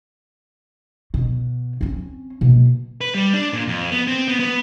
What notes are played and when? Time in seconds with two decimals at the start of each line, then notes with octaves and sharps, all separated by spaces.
1.14 B2
1.81 C4 C#4
2.41 B2 A#3
3.01 B4
3.15 G3
3.34 D4
3.53 A#2
3.67 F2
3.91 B3
4.08 C4
4.28 B3
4.40 B3